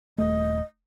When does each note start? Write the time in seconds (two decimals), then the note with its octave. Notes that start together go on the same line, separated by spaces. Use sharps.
0.18 D#1 A3 D#5